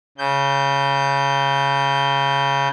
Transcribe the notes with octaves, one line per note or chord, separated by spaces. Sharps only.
C#3 G6